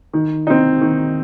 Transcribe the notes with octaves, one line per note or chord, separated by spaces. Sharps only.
D#3
C4 D#4
D#3